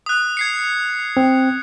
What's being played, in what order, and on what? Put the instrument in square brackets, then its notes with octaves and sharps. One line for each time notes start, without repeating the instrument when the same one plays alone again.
[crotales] D#6 F#6
G#6 C7 C#7
[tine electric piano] C4